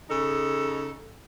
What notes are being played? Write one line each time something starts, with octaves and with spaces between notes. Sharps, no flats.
C#3 D#4 G#4 A4